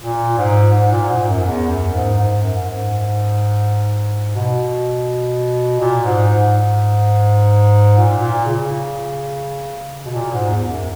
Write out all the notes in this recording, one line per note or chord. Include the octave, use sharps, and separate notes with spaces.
A#2
G#2
G#2
A#2
G#2
F#2
E2
F#2
G#2
G#2
F#2
G#2
B2
A#2
G#2
G#2
A#2
A#2
C#3
B2
A#2
G#2
E2
F#2